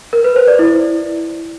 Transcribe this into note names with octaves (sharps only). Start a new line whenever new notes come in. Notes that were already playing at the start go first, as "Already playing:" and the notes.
A#4
B4
C5
D5
E4